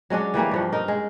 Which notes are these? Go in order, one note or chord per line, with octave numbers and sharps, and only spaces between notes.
F#3 G#3 C#4 D4
E3 G3 A#3 C#4
G2 F3 F#5
D#4 A#4
G#3